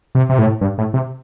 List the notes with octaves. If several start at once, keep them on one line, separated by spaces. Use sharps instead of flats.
C3
C3
A2
G2
A2
C3